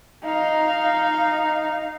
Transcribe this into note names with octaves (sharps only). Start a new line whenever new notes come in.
D#4 F5